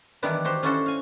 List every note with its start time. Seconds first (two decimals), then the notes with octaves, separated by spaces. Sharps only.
0.22 D#3 E3 G3 B3 D4 E4
0.45 F#4 G4 C5
0.63 C#4 D4 E4 F#4 A4 C5
0.86 F5 G#5